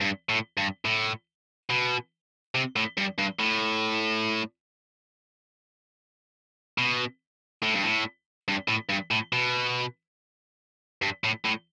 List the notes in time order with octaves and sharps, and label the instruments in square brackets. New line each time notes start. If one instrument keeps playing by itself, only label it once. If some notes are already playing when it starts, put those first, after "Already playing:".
[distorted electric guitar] G2
A2
G2
A2
B2
C3
A2
G2
G2
A2
B2
A2
G2
A2
G2
A2
G2
A2
B2
G2
A2
A2